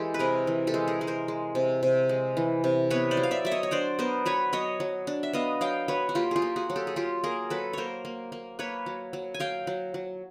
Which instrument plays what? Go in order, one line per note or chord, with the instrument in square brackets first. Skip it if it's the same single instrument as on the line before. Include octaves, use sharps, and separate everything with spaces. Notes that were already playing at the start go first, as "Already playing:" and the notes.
Already playing: [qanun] E3 G#3 G4 A4
B4
C3 G#4 A#4
E3
G4 A4
G#3
G#4 A#4
G#3
A#4 C5
G#3
C3
C3
G#3
E3
C3
B3 B4 C#5
C5 D5
F#3
F5
D5 E5
F#3 E5
C#5 D#5
C#5
D4 C5 D5
B3 A#4 C5
F#3 B4 C#5
F#3 C#5 D#5
F#3
D4
E5
B3 D#5 F5
F#3 F5 G5
F#3 B4 C#5
F#4
A#3 F4 G4
F4 G4 G#4
A#3
F#4 G#4
F#3
G4 A4
G#4
F#3 F4 G4
A#3 G#4 A#4
F#3 A4 B4
A#3 A#4 C5 C#5
A#3
A#3
A#3 B4 C#5
F#3
F#3
G#5
F#3 F5 G5
F#3
F#3